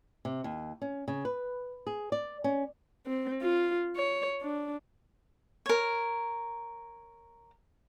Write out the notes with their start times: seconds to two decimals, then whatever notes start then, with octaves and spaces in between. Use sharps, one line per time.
0.25 C3
0.44 D#2
0.82 C#4
1.08 C#3
1.25 B4
1.87 G#4
2.12 D5
2.44 C#4
3.06 C4
3.42 F4
3.96 C#5
4.42 D4
5.66 A#4 C#5